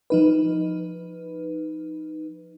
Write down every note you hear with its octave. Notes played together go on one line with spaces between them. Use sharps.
F3 D#4 B4